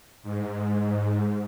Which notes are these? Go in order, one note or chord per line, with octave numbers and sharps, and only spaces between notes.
G#2